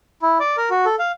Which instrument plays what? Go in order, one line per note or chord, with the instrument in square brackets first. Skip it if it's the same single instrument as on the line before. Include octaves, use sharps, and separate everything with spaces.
[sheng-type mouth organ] E4
D5
A#4
F#4
A4
F5